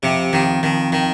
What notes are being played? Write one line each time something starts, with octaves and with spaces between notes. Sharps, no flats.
F2 C3
F2 D#3
F2 D#3
D#3